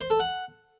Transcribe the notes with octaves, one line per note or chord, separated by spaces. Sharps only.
C5
A4
F#5